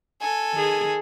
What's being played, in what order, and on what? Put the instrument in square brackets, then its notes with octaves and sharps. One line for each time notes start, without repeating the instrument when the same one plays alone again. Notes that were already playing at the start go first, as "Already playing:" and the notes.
[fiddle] A4 G#5
[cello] D#3 G#4